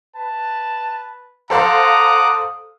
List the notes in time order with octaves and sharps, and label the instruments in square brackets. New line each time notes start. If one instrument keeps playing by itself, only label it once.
[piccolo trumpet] B4 [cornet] A5
[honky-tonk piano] A4 C5 F5 [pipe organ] F#5 D6 F#6 [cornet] A#5 [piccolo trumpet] D#6